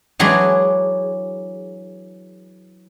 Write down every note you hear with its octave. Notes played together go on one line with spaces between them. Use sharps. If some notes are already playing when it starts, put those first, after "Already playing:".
E3 F#3 G#3 D4 G#4